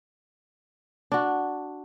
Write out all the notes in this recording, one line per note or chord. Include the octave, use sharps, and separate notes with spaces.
D4 F#4